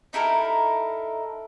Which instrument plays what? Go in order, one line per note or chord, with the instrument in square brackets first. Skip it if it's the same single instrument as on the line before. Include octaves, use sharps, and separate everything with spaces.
[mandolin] D#4 E4 A4 A#4